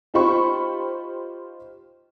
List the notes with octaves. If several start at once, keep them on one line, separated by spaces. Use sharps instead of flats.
D#4 F4 G4 C5 B5 C#6